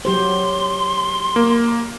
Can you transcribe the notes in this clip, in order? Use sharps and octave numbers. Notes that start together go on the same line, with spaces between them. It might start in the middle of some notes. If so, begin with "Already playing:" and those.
F#3 G4 C5 C6
A#3